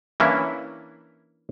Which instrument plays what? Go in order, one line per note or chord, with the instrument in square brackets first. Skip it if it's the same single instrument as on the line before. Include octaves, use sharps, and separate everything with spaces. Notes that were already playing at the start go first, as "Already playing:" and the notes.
[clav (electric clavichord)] E3 A#3 C#4 D4 E4